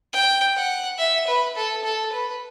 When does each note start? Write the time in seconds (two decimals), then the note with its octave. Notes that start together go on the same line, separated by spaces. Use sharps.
0.13 G5
0.56 F#5
0.98 E5
1.27 B4
1.56 A4
1.84 A4
2.12 B4